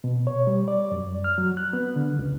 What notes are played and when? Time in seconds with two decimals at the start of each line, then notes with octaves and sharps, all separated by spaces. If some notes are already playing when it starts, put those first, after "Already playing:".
0.04 B2
0.27 C#5
0.47 G3
0.68 D5
0.92 F#2
1.24 F6
1.38 F#3
1.57 F#6
1.73 B3
1.96 D3
2.19 C#2